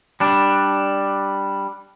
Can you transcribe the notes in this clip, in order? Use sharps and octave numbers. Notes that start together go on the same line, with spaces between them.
G3 D4